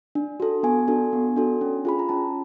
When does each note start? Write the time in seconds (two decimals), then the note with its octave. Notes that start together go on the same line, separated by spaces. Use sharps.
0.15 D4
0.40 F#4 A4
0.63 B3 G#5
0.88 D4 F#4 A4
1.13 B3
1.36 D4 F#4 A4
1.61 C#4
1.85 F4 G#4 B5
1.99 A#5
2.09 C#4 A5